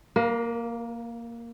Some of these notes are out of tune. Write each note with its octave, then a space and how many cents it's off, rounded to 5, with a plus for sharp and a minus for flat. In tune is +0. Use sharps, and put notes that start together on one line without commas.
A#3 +0 A#4 +45